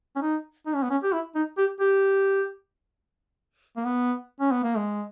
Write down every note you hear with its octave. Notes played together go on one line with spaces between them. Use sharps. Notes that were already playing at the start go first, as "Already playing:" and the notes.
C#4
D#4
D#4
C#4
B3
C#4
G4
E4
D#4
G4
G4
A#3
B3
C#4
B3
A#3
G#3